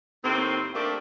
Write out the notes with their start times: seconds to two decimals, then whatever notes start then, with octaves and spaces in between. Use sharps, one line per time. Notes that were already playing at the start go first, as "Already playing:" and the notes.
0.23 D#2 A2 C4
0.74 A3 A#3 C4 D4 G4